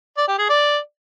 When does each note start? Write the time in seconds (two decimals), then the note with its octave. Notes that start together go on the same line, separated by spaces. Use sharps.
0.17 D5
0.28 G4
0.39 G#4
0.49 D5